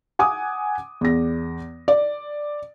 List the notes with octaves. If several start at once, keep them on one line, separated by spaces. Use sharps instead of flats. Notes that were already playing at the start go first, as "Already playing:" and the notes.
F#5 G#5 D6 D#6
E2 A#6
D5